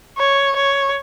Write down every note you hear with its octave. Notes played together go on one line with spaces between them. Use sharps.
C#5
C#5